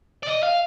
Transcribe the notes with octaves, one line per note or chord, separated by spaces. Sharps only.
D5
D#5
F5